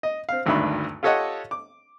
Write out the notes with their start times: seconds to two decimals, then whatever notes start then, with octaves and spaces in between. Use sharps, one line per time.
0.03 D#5
0.29 C4 F5
0.46 G#1 D2 G2 D#3 E5 B5
1.03 F4 G4 A4 C#5 D#5 F#5
1.51 D6